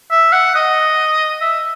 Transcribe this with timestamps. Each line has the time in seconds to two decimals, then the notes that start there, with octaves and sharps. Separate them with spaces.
0.11 E5
0.32 F#5
0.55 D#5
1.41 E5